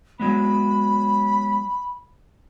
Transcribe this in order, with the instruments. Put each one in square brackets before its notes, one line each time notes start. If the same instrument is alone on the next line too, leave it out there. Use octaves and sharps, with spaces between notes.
[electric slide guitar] F#3 G#3 B3 [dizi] B5